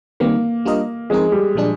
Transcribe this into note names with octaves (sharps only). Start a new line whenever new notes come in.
D#3 G3 A#3 C4
G3 D4 F4 A#4 D#5
F3 G#3 C4 D#4 A#4
G3
A#2 F3 G#3 D4 G#4